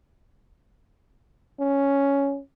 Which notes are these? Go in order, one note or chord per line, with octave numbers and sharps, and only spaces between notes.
C#4